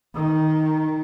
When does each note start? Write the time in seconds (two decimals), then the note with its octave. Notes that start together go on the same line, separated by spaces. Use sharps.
0.15 D#3